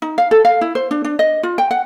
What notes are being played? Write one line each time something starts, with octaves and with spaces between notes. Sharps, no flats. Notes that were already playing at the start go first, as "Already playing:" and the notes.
D#4
F5
A4
F5
E4
C5
D4
D4
D#5
F4
G5
F#5